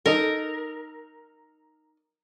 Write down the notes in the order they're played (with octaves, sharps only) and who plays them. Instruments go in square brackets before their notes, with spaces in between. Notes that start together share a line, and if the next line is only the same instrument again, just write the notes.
[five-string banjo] D#4 A4 [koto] A#4